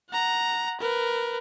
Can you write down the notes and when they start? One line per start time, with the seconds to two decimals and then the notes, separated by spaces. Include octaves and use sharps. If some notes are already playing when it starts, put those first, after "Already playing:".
0.10 F#5 A#5
0.80 A#4 B4